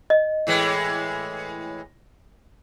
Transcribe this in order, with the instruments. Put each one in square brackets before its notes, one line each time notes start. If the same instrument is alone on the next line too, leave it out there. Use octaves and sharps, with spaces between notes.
[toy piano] D#5
[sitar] A2 E3 G#3